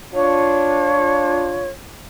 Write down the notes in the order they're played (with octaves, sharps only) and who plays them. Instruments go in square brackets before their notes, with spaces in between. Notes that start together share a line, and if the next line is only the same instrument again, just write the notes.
[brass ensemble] D4 F4 [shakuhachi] C#5